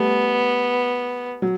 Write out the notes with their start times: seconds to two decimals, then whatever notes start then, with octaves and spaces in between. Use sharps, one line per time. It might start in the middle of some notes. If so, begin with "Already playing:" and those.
Already playing: G3 A3 B3
1.42 F#3